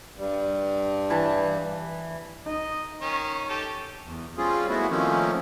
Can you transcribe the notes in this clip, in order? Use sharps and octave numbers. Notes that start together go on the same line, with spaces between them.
G2 G3
E3 A5
D#4 D#5
D#3 C#4
C#4 G4 A4
E2
G3 C4 C#4 F4 G#4
G#3 A3 B3 E4 F#4
D#3 F3 A3 A#3 C4 C#4